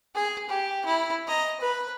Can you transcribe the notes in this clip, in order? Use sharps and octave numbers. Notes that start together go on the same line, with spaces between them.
G#4
G4
E4
D#5 A#5
B4